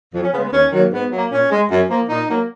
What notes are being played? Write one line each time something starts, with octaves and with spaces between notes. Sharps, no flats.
F2
C#4
C#3 G#3 B3
B3
D#2 C#4
D#3 F#3 A#3
G#2 B3
F#3 A#3
A#2 C#4
G#3
F#2
F3 A#3
A#2 D#4
F#3 A#3